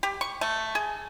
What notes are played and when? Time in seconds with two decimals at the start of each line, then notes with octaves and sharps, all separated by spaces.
0.03 G4
0.21 C#6
0.41 A3
0.75 G#4